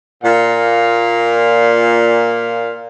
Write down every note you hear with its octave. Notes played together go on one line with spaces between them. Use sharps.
A#2 F5